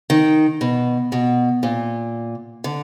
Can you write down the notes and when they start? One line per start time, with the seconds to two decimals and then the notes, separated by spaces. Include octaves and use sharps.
0.10 D#3
0.61 B2
1.12 B2
1.63 A#2
2.64 D3